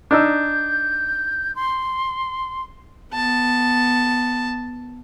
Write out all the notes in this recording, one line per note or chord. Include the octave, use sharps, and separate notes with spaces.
D4 D#4 E6 G6
C6
B3 A5